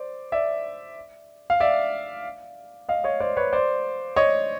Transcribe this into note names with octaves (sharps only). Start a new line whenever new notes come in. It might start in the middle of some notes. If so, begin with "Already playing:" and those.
Already playing: C5 D5
D5 E5
F5
D5 E5
D#5 F5
C#5 D#5
C5 D5
B4 C#5
C5 D5
C#5 D#5